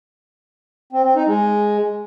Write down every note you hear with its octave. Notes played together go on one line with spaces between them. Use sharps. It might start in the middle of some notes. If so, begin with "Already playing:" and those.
C4
C4
D#4
G#3